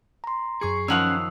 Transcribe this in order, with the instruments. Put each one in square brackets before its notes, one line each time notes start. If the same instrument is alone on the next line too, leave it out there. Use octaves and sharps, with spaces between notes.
[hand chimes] A#5 C6
[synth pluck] F#2 C#6 C7 [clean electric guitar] G#4
[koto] D#3 F3 F5 [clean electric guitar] C#4 F#5 [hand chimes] D#6 E6